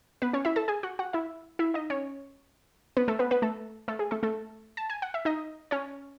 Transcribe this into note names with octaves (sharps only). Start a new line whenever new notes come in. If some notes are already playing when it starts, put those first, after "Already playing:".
B3 B4
C#4 C#5
E4 E5
A4 A5
G#4 G#5
F#4 F#5
F#4 F#5
E4 E5
E4 E5
D#4 D#5
C#4 C#5
B3 B4
A3 A4
B3 B4
B3 B4
A3 A4
A3 A4
G#4
A3 A4
A3 A4
A5
G#5
F#5
E5
D#4 D#5
C#4 C#5